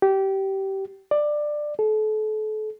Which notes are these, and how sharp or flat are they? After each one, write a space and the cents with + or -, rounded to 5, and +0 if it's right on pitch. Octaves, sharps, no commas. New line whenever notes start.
G4 -20
D5 +15
A4 -35